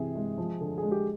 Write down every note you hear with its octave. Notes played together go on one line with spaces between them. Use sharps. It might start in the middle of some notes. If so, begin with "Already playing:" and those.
Already playing: C3 E3 G#4
G#3
F3
D3
G#4
G#3
G4